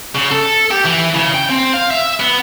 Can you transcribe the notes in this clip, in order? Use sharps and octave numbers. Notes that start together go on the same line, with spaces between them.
C#3
A4
G4
E3
C#3
G5
C4
F5
E5
B3